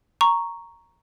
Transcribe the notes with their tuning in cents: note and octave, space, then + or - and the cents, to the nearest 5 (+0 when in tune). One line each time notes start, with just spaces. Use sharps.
A#5 +0 C#6 +0